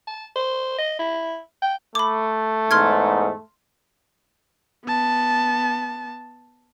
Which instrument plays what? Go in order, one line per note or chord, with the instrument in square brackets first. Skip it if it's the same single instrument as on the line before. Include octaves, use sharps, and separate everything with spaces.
[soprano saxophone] A5
C5
D#5
E4
G5
[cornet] A3 [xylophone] B5 D6
[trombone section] E2 G#2 [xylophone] C6 F6 G#6
[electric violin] B3 A5